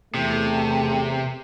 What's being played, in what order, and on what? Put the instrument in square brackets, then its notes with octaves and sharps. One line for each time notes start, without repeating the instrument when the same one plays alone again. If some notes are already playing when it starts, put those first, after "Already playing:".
[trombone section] E2 A3 [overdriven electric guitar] C3